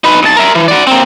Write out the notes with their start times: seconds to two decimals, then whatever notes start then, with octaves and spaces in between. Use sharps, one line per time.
0.04 D#4 B4
0.23 B1 A5
0.36 A#4 E5
0.55 E3
0.68 F#4 D5
0.87 A#3 C4